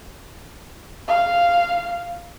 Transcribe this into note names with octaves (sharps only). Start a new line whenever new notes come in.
F5